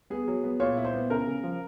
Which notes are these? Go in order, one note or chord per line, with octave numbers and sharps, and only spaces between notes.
B3 G#4
F#3
B3
A#2 C#5
E4
C5
B3
C#3 A#4
C#3
F3